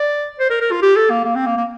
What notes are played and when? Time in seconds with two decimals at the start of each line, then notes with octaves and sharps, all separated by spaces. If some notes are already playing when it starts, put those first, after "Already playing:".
Already playing: D5
0.39 C5
0.50 A#4
0.61 A#4
0.71 F4
0.82 G4
0.96 A4
1.10 A#3
1.25 A#3
1.36 C4
1.46 A#3
1.57 A#3